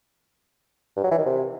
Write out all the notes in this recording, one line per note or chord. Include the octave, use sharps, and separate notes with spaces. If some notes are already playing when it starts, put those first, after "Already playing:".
G2
F#3
E3
D#3
C3